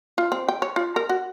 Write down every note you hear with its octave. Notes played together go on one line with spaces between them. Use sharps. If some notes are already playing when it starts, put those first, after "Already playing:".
F4
C4
G5
C#5
F4
A#4
F#4